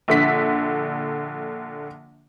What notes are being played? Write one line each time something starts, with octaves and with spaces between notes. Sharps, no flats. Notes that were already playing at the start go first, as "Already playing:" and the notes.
A#1 D3 B6